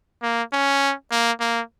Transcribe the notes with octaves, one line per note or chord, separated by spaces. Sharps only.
A#3
C#4
A#3
A#3